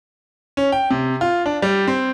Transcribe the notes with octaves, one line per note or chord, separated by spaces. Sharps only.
C#4
G5
C3
F4
D4
G3
C4